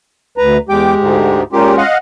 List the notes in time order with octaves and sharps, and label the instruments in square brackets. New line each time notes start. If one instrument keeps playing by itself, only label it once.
[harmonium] D2 B4 A#5
[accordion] E2 G5 D6 [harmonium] G#3 G4
[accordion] D2 G#2
[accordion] A#2 A#3 G4 [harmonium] G#3 C#4 F4
[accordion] D#5 F5 F#5